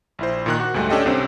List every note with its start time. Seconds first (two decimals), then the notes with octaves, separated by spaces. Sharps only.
0.19 A#1 E4 C5
0.46 A#2 D#3 F#6
0.60 F#4
0.74 D2 G#2 G3 A3
0.90 C#4 D4 G4 A4 D#5 G5
1.06 C2 C3 C4 C#4